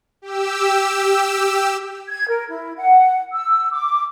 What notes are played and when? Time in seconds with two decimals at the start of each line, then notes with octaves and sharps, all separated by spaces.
0.22 G4 E6
2.08 G#6
2.29 A#4
2.49 E4
2.76 F#5
3.33 E6
3.72 D6